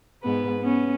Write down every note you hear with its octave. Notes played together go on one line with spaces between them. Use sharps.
G#2 B3 B4
B3 C#4